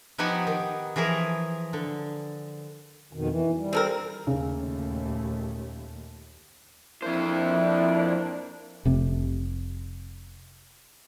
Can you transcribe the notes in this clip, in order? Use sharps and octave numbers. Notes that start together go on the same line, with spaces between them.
F3 B3 D#4 G4 F#5 G#5
D#3
E3 F3 G#4 A#4
D3
F2 B2 D#3
E3
G3
C4 A4 A#4
D#2 A#2 C#3 A3
F2 A#3 C4 D4 E4 C5
F1 C3 A3